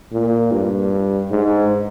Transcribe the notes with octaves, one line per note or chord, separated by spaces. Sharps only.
A#2
G2
G#2